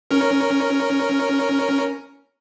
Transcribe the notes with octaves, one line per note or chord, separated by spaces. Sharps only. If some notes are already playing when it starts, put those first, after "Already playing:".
C#4 A#4